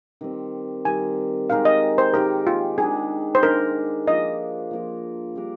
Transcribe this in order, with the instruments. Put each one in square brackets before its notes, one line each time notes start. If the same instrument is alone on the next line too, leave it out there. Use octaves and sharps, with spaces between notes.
[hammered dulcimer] D#3 G3 C4
[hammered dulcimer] D#3 G3 C4 [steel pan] G#5
[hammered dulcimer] D#3 G#3 D#4 G4 [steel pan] F5
[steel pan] D#5
C5
[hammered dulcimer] D#3 G#3 D#4 G4 [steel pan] A#4
[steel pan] F4
[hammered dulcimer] D#3 G#3 D4 [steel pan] G#4
[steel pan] C5
[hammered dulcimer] D#3 G#3 D4 [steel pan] A#4
[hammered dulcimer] F3 A#3 F4 A#4 [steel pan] D#5
[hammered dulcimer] F3 A#3 F4 A#4
G3 D4 G4 A#4